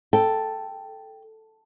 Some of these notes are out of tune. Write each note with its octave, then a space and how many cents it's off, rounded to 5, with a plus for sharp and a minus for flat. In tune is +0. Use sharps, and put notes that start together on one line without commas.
A4 +0 G5 +0